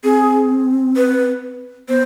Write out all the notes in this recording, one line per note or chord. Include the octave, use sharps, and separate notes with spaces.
C4 G#4
B4
B3 C5